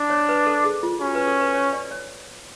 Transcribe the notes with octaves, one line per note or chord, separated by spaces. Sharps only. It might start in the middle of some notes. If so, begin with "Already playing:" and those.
Already playing: D4
C#5
B4
A4
G#4
F4
C#4 F#4
B4
A4
B4
C#5
D5
C#5